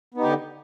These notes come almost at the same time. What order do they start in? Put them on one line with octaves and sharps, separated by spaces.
B3 D#4 G4 D3